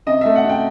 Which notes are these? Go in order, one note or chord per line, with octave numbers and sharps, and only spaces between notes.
C3 D#5
A3 E5
F#5
C3
G5